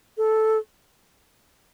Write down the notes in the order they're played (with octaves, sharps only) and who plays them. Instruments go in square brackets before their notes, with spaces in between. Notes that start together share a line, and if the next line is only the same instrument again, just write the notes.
[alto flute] A4